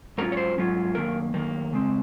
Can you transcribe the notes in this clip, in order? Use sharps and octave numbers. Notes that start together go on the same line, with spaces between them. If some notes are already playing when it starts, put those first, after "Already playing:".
G#2 F#3 C#4 F4 A#4
C#5
C5
G#2 F#3 C#4 F4
F#2 D#3 A#3 A#4
F#2 D#3 A#3
C#3 G#3 C4